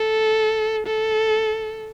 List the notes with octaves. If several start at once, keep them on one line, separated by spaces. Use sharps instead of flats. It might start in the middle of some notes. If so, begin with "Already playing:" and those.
Already playing: A4
A4